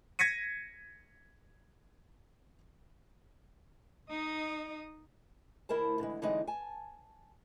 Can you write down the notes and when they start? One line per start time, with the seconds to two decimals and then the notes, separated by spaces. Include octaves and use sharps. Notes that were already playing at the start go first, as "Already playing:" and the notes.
0.19 G#6 A#6 B6 C#7 D#7
4.10 D#4 D#5
5.69 D2 E4 A#4 C5 A5
5.99 D3 E3 G#3
6.22 D3 E3 F#3 G#3 C4 D#4
6.47 G#5 A5